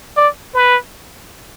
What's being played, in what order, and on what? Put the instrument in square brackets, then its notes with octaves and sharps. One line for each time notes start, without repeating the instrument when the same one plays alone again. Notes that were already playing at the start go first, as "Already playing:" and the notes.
[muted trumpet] D5
B4